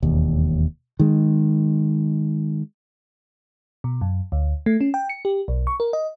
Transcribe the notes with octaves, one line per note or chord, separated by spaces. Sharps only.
E1 D#2
D#3 G#3
B2
F#2
D2
A3
C#4
G5
C#7
G4
B1
C#6
A#4
D#5